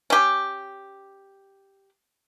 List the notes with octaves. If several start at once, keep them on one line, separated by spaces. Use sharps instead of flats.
C#4 G4